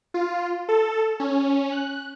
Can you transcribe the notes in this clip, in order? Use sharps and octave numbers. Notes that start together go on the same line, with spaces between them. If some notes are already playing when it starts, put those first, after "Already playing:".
F4
A4
C#4
F#6